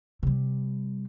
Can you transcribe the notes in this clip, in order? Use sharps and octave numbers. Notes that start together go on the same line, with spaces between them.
C3 G3